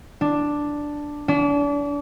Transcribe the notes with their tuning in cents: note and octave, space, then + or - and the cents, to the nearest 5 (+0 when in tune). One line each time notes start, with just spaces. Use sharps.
D4 +0
D4 -35